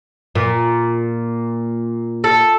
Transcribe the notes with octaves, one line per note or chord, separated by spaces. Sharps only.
A#2
A4